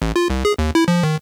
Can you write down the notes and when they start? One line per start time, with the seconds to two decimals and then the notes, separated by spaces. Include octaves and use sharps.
0.02 A1
0.16 F4
0.30 C2
0.45 G#4
0.58 D#2
0.75 E4
0.88 F3
1.03 D#3